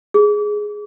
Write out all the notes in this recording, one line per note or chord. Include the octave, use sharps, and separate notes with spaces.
G#4